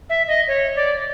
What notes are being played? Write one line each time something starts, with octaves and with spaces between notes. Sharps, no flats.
E5
D#5
C#5
D5